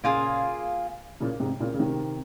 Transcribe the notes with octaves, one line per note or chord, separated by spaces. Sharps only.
A#2 C#3 A#3 F4 G#4
A#2 C#3
G#2 C3
A#2 C#3
C#3
C3 D#3